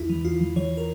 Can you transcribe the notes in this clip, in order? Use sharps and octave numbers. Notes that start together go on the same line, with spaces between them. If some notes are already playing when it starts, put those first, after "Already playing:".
Already playing: E2 E4
E3
E2 F4
E3
E3 C#5
A#4